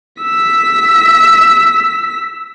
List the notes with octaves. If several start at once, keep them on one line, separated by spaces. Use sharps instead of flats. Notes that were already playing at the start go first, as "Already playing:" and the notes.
E6 B6